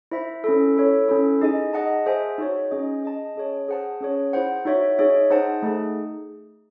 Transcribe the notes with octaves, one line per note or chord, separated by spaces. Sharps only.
E4 C5 E5
C#4 E4 A4
E4 A4 C#5
C#4 E4 A4
D#4 G#4 D#5 G#5
G#4 D#5 F#5 A5
G#4 C5 E5 G#5
D#4 F#4 C#5
C#4 G#4 D#5
G#4 D#5 A5
C#4 G#4 C#5
G#4 C5 F#5 A5
C#4 G#4 C#5
E4 G#4 C5 F#5
D#4 F#4 C#5 E5
D#4 G#4 C#5 E5
D#4 G#4 C5 F#5 A5
A3 D#4 G#4